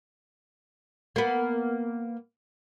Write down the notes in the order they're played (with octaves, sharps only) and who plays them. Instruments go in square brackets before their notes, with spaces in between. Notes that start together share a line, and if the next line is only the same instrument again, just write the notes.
[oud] A#3 B3